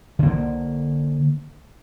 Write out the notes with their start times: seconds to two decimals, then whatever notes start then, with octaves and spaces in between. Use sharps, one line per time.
0.19 D3 A#3